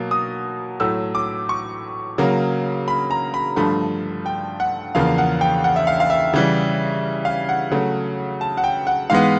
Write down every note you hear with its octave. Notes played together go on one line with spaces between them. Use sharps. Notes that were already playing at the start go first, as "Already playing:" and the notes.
Already playing: B2 F#3 A#3
D#6
A2 F#3 A3 E6
D6
C#6
C#3 F#3 A#3
B5
A#5
B5
G2 D3 F3 A3 B5
G5
F#5
E2 C#3 F3 A#3 F5
F#5
G5
F#5
E5
F5
F5
E5
C#3 E3 G3
F5
F#5
C#3 F#3 A3
A5
F#5
G5
F#5
G#2 E3 G#3 B3 F5